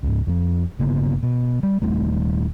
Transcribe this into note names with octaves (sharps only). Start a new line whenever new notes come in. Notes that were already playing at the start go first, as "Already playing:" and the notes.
C#2 G#2
F2 F3
G1 C#3 A#3 B3
B2
G3
D#1 D#2 G3 A3